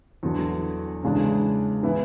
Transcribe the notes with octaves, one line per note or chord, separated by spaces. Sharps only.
E2 D3 F#3
E2 C#3 G#3 D4
E3 B3 E4